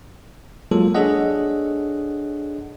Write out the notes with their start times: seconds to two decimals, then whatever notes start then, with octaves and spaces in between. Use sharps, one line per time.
0.71 F#3 G#3 A#3 F4 A4
0.95 D4 G#4 A4 C#5 D#5 F#5